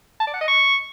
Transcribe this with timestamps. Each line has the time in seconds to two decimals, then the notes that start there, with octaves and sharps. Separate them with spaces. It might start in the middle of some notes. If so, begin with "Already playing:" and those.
0.20 A5
0.27 D5
0.34 F#5
0.41 D#5
0.48 C#6